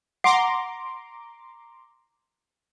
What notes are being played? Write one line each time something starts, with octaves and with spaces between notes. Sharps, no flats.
F#5 A#5 C6 D6